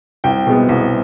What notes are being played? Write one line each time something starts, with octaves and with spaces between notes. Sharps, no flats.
C2 G5
B2 G#3 B3
C2